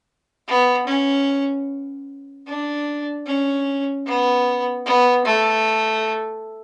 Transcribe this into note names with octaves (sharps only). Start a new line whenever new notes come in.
B3
C#4
D4
C#4
B3
B3
A3